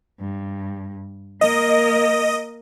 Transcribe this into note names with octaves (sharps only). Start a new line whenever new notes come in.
G2
A#3 A#4 D#5